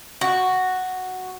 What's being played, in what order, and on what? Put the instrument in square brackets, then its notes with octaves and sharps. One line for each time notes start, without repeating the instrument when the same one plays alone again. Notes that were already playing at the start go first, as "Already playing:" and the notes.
[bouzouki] F#4